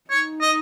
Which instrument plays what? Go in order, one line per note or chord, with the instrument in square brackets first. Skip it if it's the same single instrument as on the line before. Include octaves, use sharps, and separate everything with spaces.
[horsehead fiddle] D#4 [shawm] C#5
[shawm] D#5